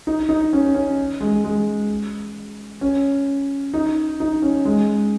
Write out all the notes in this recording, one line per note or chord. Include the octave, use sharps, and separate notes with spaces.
D#4
D#4
C#4
C#4
G#3
G#3
C#4
D#4
D#4
C#4
G#3